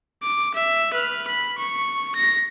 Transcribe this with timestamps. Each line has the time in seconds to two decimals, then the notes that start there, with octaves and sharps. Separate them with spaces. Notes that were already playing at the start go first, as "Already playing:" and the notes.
0.23 D6
0.54 E5
0.94 B4 F6
1.28 B5
1.58 C#6
2.16 A#6